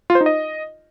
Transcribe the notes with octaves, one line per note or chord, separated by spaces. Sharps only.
F4
C5
D#4
D#5